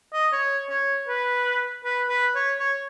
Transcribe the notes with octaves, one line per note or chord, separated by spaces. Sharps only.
D#5
C#5
C#5
B4
B4
B4
C#5
C#5